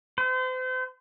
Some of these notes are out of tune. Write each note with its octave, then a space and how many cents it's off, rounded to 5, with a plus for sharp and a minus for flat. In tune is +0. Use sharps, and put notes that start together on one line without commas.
C5 -35